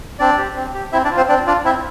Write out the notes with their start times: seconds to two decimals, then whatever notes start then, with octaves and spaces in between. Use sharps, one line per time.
0.19 C4 D4 D5
0.38 G4
0.56 C4
0.74 G4
0.92 C4 E4 E5
1.05 D4 D5
1.11 F4
1.17 C4 C5
1.29 C4 D4 D5
1.47 D4 F4 D5
1.65 C4 E4 E5